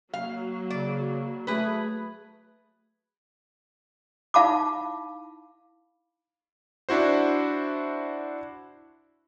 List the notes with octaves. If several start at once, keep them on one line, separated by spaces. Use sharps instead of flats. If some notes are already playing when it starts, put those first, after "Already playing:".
F#3 A#3 F5
C#3 D5
A3 G#4 B4
D#4 E4 F5 A5 B5 D6
D4 E4 F#4 C5